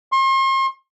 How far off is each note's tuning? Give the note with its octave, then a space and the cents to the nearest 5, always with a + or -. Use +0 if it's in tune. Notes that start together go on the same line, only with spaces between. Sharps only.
C6 +40